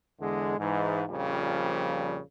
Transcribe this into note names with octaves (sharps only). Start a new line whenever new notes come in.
E2 D3 G#3
G#2 E3
A#1 F2 A#2 C#3 F3 G3